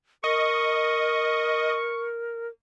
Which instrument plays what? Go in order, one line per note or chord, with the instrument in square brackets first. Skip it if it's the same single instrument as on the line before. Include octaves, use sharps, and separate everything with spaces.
[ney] A#4 [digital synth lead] D#5 [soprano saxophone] C#6